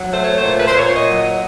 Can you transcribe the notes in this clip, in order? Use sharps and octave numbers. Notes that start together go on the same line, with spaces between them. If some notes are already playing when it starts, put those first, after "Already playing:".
Already playing: F#3
A3 C5
C#5
C5
A#2
B4
C5
A#2 C#5
D#5
F#3
D#5